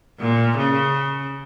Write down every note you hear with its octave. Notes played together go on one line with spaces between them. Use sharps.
A#2
C#3